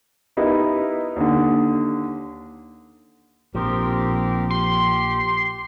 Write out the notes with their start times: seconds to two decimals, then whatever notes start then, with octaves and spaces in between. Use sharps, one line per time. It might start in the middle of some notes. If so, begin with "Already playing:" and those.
0.37 B3 D#4 E4 G4 A#4 B4
1.16 D#2 D3
3.55 A#1 F3 C4 G4 A#4
4.50 G4 C6